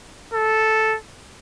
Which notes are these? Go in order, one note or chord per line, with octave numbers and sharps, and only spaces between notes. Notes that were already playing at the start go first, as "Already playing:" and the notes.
A4